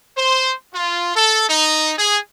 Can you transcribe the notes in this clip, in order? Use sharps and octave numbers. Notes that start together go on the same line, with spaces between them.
C5
F4
A4
D#4
G#4